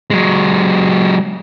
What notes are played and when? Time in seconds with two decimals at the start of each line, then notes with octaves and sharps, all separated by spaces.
0.10 F#3 G#3